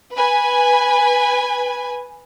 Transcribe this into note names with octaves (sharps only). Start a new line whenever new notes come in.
B4 G#5